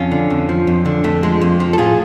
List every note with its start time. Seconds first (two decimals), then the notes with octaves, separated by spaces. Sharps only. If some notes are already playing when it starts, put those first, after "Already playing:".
Already playing: F2 C#4 F4
0.11 D3
0.30 F2
0.49 F3
0.67 F2
0.86 D3
1.04 F2 A3
1.23 F3 G#3
1.41 F2
1.60 F3
1.73 A4
1.78 A2 F4 G#4